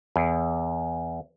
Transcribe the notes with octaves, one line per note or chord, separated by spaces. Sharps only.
E2